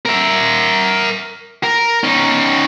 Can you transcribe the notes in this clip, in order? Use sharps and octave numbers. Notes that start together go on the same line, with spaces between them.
A#4 E5
A#4
C#4 D#4